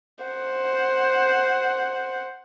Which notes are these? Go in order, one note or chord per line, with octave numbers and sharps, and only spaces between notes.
C5 F#5